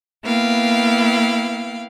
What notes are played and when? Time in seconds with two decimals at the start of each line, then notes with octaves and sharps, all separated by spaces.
0.23 A#3 B3 E4 F5 G5